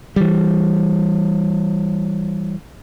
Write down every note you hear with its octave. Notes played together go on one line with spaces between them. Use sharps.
E3 G3